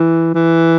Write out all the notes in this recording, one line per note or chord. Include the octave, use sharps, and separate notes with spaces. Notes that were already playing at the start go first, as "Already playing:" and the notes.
Already playing: E3
E3